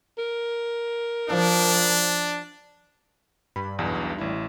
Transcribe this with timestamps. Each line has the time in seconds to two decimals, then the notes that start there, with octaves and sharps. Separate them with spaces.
0.18 A#4
1.29 F3 D4
3.56 G2 B5
3.79 B1 E2 B2
3.95 G2
4.18 A1 E4